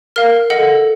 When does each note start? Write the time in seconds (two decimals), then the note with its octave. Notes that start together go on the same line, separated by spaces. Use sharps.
0.16 A#4 F5 F6
0.50 A4 D#5 F#5